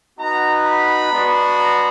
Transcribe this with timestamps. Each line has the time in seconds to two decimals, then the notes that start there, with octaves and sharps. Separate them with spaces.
0.19 B3 D#4 F#4 A#5
0.65 B5
1.12 G#3 B3 D4 F#4
1.59 A#5